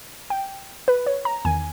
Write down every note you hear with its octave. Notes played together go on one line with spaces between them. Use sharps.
G5
B4
C#5
A#5
E2 D#3 G#5